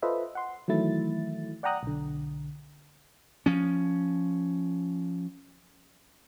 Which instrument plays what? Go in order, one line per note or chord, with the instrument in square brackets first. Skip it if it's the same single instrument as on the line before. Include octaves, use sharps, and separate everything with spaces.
[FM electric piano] F4 A4 B4 C5 D#5 E5
F#5 C6
D#3 E3 F#3 A3 E4 A6
D5 F#5 G5 A#5 D#6 F#6
B1 D3
[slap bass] F3 C#4